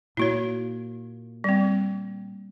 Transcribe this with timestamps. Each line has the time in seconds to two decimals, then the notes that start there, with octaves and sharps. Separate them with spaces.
0.17 A#2 A#3 E4 F#4 C#5
1.44 G3 C4